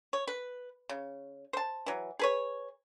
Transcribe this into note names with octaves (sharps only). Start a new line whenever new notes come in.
C#5
B4
C#3
C5 A5
E3 F#3
G#4 B4 C#5